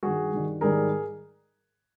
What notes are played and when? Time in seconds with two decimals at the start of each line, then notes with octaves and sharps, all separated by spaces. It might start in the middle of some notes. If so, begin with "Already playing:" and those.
0.03 G2 D#3 G3 F#4 G#4
0.33 G2 D#3 G3
0.61 G#2 D#3 G3 G#4 A#4